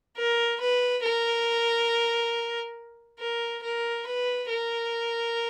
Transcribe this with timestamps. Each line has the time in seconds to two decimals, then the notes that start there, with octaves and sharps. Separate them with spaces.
0.17 A#4
0.60 B4
1.04 A#4
3.20 A#4
3.63 A#4
4.07 B4
4.49 A#4